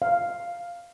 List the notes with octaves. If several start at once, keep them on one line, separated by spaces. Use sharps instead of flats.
F5